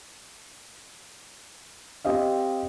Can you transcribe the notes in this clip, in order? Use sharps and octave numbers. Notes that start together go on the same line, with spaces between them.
C4 G4 D#5 F5